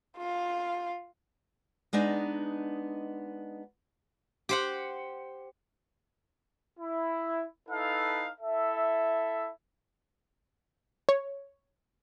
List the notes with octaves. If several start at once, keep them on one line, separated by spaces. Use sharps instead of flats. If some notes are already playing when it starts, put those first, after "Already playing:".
F4 F5
G#3 B3 D4 D#4
G4 C5 F#5
E4
D#4 E4 A4 B4 F5
E4 A4 E5
C#5